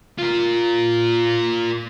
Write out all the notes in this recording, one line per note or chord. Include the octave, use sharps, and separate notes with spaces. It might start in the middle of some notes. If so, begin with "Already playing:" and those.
F4 A#4